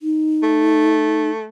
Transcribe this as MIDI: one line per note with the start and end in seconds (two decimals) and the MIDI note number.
0.01 1.30 63
0.43 1.47 57